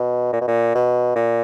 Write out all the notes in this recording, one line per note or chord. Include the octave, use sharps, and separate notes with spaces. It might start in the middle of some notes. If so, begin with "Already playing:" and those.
Already playing: B2
A#2
B2
A#2
B2
A#2